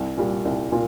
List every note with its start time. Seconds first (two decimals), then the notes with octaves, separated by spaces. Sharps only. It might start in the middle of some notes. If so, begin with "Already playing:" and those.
Already playing: C2
0.17 A#2 G3
0.45 C2
0.72 A#2